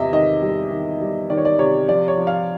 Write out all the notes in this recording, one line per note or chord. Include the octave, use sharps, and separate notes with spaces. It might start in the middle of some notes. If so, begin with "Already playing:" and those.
Already playing: E2 C3 D#5 E5
D#3 D#5
G3
D#3
G3
D#3 D5
C#5
D5
C3 C#5
F3 D5
C#5
F3
F5